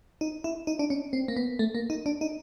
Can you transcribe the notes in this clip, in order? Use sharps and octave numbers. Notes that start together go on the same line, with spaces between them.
D#4
E4
D#4
D4
C#4
C4
A#3
B3
A3
A#3
D#4
D4
D#4